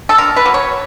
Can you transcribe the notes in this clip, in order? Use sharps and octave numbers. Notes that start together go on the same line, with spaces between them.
A4
D3 A#4
B4
F#3 A#3
C#5